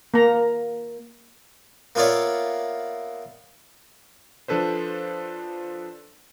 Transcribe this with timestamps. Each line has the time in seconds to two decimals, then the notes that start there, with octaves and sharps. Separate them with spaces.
0.14 A#3 A#5
1.95 A#3 B3 F4 C#5 D5 E5
4.48 F3 D4 A4 B4 C5